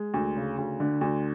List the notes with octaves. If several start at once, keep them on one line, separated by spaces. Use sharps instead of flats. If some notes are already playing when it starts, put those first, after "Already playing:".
Already playing: G#3
D2
C#3
D2
D3
D2